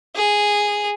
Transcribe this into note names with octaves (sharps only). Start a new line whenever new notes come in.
G#4